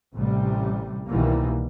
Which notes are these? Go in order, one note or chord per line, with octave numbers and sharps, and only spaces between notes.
A1 C3 G3
C2 B2 D#3 E3 G3 A#3